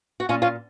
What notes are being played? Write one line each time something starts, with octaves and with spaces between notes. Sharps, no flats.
F#4
A#2 C#4 F4
C#4 F4